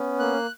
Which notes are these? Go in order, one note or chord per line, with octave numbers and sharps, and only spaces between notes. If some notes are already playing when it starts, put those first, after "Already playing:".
Already playing: B3 C#4
A#3 F#6